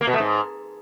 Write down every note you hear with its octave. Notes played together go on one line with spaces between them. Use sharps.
A#3
B2
A3
G#2